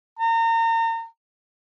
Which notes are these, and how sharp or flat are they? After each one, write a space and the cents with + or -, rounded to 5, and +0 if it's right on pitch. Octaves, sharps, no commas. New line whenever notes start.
A#5 -35